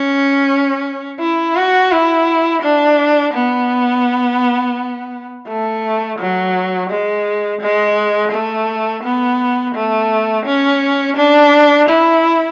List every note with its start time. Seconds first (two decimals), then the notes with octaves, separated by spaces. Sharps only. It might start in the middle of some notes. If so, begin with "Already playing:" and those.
Already playing: C#4
1.20 E4
1.56 F#4
1.92 E4
2.63 D4
3.34 B3
5.47 A3
6.19 F#3
6.90 G#3
7.61 G#3
8.32 A3
9.03 B3
9.75 A3
10.46 C#4
11.17 D4
11.89 E4